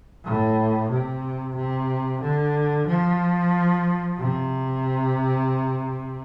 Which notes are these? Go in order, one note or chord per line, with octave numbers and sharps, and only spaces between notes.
A2
C3
C3
D3
F3
C3